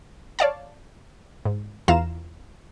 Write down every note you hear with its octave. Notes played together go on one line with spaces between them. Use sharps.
C#5 D5 F5 A5
G#2
E2 E3 F4 F5 A#5 E7